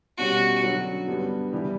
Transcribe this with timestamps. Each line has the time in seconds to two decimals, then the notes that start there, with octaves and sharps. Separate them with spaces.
0.18 B2 G3 C#4 F#4 G4
0.63 D3 F#3 C#4 F#4 C#5
1.08 G2 D3 G3 B3
1.52 E3 G3 D4 G4